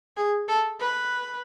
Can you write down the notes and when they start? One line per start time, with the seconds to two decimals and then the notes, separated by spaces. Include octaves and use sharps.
0.17 G#4
0.48 A4
0.80 B4